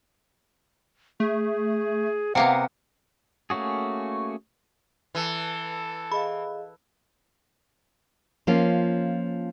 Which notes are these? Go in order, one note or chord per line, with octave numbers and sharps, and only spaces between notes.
A3 G#4
C3 A#3 B3 F5 F#5
A3 A#3 C#4 F#4 G#4
E3 A4
G#4 D#5 F5 B5
F3 A#3 C#4 F4